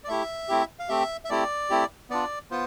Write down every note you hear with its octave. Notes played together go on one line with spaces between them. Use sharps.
D5
A3 E4 G4 E5
A3 C4 E4 G4
F5
A3 C4 G4 E5
E5
A3 C4 E4 G4 D5
A3 C4 E4 G4
B3 D4 F4 D5
B3 F4 C5